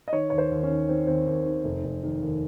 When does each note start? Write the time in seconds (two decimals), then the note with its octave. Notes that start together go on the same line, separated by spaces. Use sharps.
0.08 D#5
0.12 D#3 C#5
0.30 D#2 C#5
0.38 C5
0.51 D#2
0.63 C#4
0.70 D#3
0.89 D#3 C4
1.07 D#2 C4
1.27 D#2
1.46 D#3
1.64 F1
1.84 F1
2.03 D#3
2.22 D#2